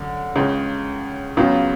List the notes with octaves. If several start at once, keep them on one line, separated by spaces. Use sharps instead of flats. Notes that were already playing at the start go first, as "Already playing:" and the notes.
Already playing: F#2 D3
C#2 C#3 G#3
C#2 C#3 F#3 B3 F4